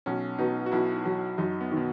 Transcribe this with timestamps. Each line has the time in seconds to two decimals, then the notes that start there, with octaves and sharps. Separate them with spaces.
0.06 B1 C#4
0.39 B2 D#4
0.66 F#4
0.72 B1 E4
1.05 F#3
1.38 F#2 D#4
1.61 B3
1.71 D#3
1.77 B2